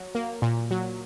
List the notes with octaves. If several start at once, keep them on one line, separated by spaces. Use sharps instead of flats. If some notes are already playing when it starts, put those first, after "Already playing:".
Already playing: F#3
A#3
A#2
F#3